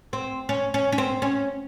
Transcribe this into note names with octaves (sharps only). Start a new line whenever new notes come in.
C4
C#4
C#4
C#4
C4
C#4